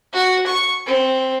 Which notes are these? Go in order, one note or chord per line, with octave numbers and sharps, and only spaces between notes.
F#4
C#6
C4